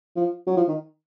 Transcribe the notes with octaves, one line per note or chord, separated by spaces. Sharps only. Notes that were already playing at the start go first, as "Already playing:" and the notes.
F3
F#3
F3
D#3